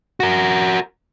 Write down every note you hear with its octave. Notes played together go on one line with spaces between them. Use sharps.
F#4 A#4